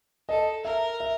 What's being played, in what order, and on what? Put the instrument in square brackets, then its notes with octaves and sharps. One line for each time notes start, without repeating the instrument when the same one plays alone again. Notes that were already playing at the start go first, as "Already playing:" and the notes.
[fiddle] A4 [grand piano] D#5
[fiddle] A#4 [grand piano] E5
[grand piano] E5